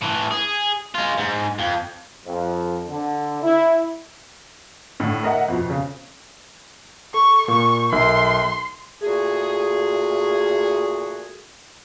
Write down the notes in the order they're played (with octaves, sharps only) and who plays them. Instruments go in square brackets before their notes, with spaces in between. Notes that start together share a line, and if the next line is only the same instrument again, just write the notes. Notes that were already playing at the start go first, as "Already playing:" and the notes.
[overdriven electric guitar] A2 E3
G#4
G#3 F4
G#2
F2
[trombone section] F2
D3
E4
[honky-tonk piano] A2 D3
A#4 D#5 E5 F#5
F2 B2
C#3
[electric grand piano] A4 [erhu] C#6
[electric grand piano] A#2 [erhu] C#6
[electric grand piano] B1 A#4 E5 [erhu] C6
[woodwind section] A#2 A3 F#4 G#4